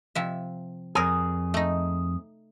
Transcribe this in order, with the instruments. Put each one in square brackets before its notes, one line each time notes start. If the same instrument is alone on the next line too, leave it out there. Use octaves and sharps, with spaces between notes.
[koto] C3 F3 E5
[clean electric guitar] F2 G#4 [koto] A#4 G#5
[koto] A3 D#4